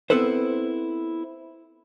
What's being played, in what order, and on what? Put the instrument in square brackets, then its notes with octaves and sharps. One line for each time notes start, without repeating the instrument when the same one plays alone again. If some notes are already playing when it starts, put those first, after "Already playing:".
[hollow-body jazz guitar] B3 C4 E4 A4 B4 C5